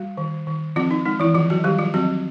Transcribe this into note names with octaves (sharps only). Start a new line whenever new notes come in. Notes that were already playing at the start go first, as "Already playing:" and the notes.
Already playing: G3 F#4
D#3
D#3
F3 C4 F4
D#4
G#3 D#4
E3 E4
D#3 F3 F4
F#3 F#4
D#3 G3 G4
F3 F4
F#3 C4 F#4